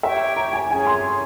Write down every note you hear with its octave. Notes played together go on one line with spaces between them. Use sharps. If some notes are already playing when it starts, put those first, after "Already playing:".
G4 C#5 E5 G5 C#6
A#5
G#5
C#4 E4 G#4 C#5 G#5
C6